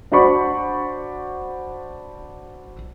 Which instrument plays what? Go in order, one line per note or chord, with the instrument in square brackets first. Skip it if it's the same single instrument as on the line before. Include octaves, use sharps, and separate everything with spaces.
[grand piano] D4 F#4 C5 D5 B5 C#6